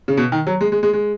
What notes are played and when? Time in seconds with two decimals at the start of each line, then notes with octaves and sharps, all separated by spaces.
0.08 C#3
0.17 B2
0.32 D#3
0.47 F#3
0.61 G#3
0.72 G#3
0.83 G#3
0.93 G#3